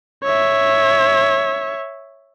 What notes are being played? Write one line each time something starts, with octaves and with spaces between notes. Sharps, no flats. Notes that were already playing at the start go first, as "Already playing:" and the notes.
C#5 E5